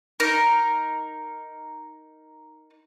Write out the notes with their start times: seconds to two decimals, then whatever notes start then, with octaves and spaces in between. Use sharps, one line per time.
0.20 D#4 A#4